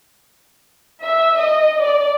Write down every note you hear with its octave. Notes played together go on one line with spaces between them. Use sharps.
E5
D#5
D5